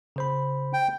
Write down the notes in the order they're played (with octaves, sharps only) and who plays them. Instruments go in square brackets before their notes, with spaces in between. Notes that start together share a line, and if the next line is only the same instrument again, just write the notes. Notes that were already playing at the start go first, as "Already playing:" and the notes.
[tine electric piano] C#3 C5 B5
[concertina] G5